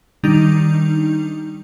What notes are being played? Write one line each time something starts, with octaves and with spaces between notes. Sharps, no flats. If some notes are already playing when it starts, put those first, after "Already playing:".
D#3 G3 D4 D#4 G6 F7